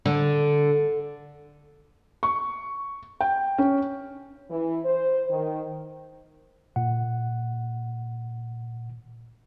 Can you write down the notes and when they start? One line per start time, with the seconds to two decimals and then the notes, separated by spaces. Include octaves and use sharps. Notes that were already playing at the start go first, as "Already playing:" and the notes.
0.06 D3
2.23 C#6
3.20 G5
3.58 C#4
4.50 E3
4.85 C5
5.30 D#3
6.76 A#2 F#5